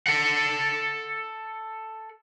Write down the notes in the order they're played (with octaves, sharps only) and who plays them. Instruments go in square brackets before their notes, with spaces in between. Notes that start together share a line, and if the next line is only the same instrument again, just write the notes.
[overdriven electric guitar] A4 F#5